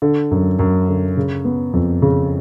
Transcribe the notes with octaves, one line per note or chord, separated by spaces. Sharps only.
D3
F#2
F#2
D3
C#3
B3
F2
C#3